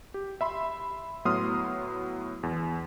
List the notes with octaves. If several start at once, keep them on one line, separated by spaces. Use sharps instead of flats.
G4
E5 B5 C6
A2 F#3 B3 C6 D#6 F6
E2